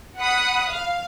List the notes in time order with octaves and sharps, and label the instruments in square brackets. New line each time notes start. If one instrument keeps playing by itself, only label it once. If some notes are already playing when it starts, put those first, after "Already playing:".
[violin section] F#5 B5 D#6 F#6
F5